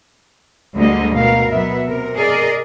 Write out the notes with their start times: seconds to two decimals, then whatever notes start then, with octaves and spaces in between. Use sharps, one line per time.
0.75 D2 D3 G3 G#3 A#3 D#5
1.15 B2 A#4 F5
1.51 B2 F#3 B3 E5
1.87 C3 A#4
2.16 G#4 A#4 D5 D#5